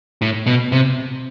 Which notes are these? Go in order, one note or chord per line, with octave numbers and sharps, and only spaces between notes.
A2
B2
C3